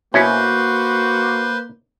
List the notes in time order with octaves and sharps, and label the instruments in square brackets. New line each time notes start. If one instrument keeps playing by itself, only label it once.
[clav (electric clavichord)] B2 C#4 E4 [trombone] A#3 [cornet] F#4 [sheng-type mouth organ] B4 C5 C6